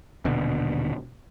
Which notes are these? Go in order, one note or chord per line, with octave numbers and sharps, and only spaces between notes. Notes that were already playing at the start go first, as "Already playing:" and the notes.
D#1 B2 D3